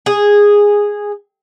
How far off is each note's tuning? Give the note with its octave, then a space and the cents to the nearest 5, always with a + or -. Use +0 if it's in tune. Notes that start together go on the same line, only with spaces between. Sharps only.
G#4 -10